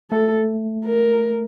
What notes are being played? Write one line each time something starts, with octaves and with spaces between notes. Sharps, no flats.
A3 A4
A#4